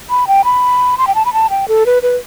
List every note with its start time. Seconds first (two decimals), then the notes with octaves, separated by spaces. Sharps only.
0.10 B5
0.27 G5
0.45 B5
0.98 C6
1.07 G5
1.15 A5
1.25 B5
1.33 A5
1.50 G5
1.68 A4
1.86 B4
2.03 B4